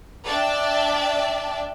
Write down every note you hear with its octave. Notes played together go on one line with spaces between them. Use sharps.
D4 D5 E5 G5 A5